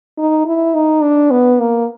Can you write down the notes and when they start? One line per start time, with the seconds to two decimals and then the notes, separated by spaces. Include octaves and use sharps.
0.18 D#4
0.46 E4
0.74 D#4
1.03 D4
1.31 B3
1.60 A#3